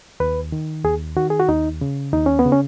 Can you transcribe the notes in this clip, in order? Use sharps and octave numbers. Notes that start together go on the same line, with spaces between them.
D#2 B4
D#3
D#2 G#4
D#3 F#4
G#4
F#4
D#2 D#4
C#3
D#2 D#4
C#4
B3
C#3
C#4